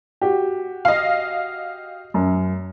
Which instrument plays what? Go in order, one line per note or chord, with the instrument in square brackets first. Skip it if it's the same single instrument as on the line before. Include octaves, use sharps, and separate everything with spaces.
[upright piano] F#4 G4
[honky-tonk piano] D#5 F5
[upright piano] F#2